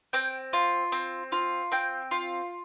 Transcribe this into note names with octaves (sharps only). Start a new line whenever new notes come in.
C4 G5
F4
C4
F4
C4 G5
F4